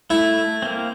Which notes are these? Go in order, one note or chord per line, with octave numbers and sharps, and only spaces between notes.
A3 E4
A#3 C4